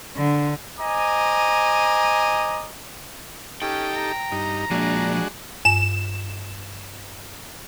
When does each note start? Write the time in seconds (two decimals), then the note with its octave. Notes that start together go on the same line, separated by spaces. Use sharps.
0.16 D3
0.79 C5 D#5 G#5 A#5 D6
3.62 C#4 D#4 G4 A4 G5
3.96 A#5
4.32 G2 D#4
4.71 F3 G#3 A#3 D4 F#4
5.65 G2 E7